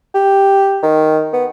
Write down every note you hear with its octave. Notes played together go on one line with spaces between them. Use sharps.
G4
D#3
B3